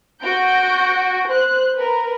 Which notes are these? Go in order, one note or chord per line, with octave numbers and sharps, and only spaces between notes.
F#4 G6 A#6 D7
C5 F#6
A#4 B4